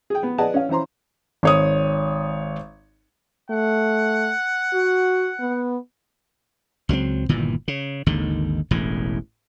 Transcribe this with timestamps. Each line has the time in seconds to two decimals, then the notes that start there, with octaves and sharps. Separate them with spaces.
0.10 G#4 G5
0.23 B3
0.38 G#4 B4 D5 D#5 F#5 A5
0.54 C#4 F5
0.69 E3 C#4 C5 A#5 C6
1.43 G#1 C#5 D#6
3.50 A3 F#5
4.74 F#4
5.40 B3
6.89 C#2 F#3 G#3 C4
7.29 G1 A#2 D#3 E3
7.68 C#3
8.06 G#1 D#2 D3 D#3
8.71 E1 A1 A2 E3